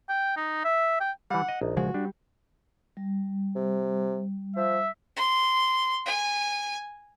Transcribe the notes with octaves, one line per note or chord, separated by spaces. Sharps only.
G5
D#4
E5
G5
E3 G3 F#5
D#5
A#1 D#4
C#3 F3 G#3 F#4
G3 D4
G3
C3
F3 E5
C6
G#5